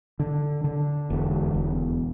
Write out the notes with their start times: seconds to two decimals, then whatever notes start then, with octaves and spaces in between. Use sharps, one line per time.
0.20 D3
0.64 D3
1.10 E1
1.54 E1